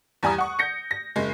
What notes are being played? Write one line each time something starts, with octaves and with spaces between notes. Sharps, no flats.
E2 G3 G#5 A#5 D#6
F#5 C#6
G6 A#6 C#7
A#6
F#1 G#3